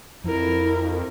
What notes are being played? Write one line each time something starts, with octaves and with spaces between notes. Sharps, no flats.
F2 E4 A#4